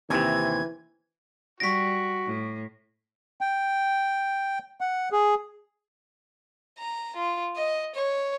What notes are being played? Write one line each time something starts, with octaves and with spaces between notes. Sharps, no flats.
D#2 C3 E3 C4 G#6
G3 F#4 C#6 A#6 B6 D7
A2
G5
F#5
G#4
A#5
F4
D#5
C#5